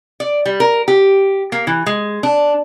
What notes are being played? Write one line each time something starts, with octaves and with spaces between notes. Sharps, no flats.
D5
G3
A#4
G4
A#3
E3
G#3
D4